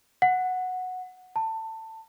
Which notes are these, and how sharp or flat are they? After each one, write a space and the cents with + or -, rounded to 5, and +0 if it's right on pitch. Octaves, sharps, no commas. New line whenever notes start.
F#5 -5
A5 +20